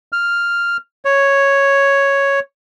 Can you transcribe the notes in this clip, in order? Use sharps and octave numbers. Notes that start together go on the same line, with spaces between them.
F6
C#5